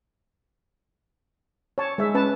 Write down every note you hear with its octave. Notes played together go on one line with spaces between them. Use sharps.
C#5 A5
G#3 E5
C#4 B4 A5